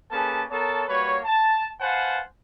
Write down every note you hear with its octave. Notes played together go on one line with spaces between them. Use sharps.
A#3 C#4 G#4 A4 B4 A5
B3 A4 A#4 C#5 A5
G3 A#3 F#4 B4 C#5
A5
B4 C5 F5 F#5 G#5 A5